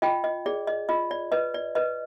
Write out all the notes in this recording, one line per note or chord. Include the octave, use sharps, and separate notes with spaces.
F4 D#5 G5
D#5
G#4 D5
D#5
F4 D#5
D5
B4 D#5
D5
B4 D#5